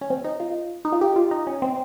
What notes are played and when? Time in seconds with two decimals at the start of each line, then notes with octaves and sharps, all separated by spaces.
0.01 C#4
0.10 C4
0.24 D#4
0.40 F4
0.85 D#4
0.92 F4
1.01 G4
1.16 F4
1.31 D#4
1.47 C#4
1.62 C4